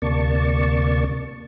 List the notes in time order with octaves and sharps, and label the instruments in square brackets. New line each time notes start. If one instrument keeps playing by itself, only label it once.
[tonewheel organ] D2 C3 A#3 D5 A5 C#6